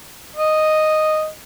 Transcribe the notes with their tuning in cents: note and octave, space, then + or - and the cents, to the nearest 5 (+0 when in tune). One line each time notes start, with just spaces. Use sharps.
D#5 -5